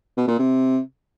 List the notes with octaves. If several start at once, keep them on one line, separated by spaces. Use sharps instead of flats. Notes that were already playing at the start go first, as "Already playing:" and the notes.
B2
A#2
C3